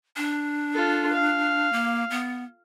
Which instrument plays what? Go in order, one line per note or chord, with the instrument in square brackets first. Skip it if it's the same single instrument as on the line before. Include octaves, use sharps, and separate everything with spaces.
[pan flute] D4
[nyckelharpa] F4 A4
F5
[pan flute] A#3
B3